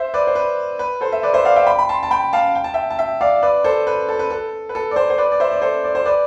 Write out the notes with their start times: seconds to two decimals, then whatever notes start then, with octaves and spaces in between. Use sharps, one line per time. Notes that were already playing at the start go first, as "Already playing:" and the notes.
Already playing: C5 E5
0.14 B4 D5
0.27 C5
0.35 B4
0.79 B4
1.01 A4 C5
1.12 E5
1.23 B4 D5
1.34 C5 E5
1.45 D5 F5
1.56 E5 G5
1.67 G5 B5
1.79 B5
1.89 A5 C6
2.03 A5
2.11 G5 B5
2.33 F5 A5
2.55 G5
2.64 A5
2.74 E5 G5
2.90 A5
2.99 E5 G5
3.21 D5 F5
3.43 B4 D5
3.64 A4 C5
3.87 B4
4.09 A4
4.19 B4
4.30 A4
4.69 B4
4.75 A4
4.91 D5
4.96 A4 C5
5.10 C5
5.18 B4 D5
5.32 D5
5.40 C5 E5
5.52 D5
5.62 A4 C5
5.84 D5
5.95 C5
6.06 B4 D5